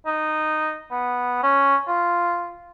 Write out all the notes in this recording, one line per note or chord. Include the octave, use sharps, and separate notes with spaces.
D#4
B3
C#4
F4